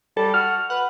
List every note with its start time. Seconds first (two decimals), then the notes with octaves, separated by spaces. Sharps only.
0.17 G3 A4
0.34 F#4 F6
0.70 B4 F#5